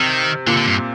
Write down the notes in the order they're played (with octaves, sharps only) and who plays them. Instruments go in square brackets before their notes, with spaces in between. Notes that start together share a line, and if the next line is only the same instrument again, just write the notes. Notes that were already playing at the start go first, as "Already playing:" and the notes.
Already playing: [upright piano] C3 [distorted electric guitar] D#3
[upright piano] A#2 [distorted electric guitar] D3
[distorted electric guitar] D3
G2